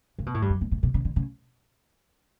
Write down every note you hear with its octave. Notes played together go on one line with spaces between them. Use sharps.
C#3
B2
A2
G2
F#2
G2
A2
B2
C#3
D3
C#3